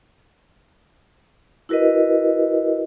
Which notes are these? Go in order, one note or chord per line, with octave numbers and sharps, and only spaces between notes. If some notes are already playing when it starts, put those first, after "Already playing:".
E4 F#4 A#4 B4 D#5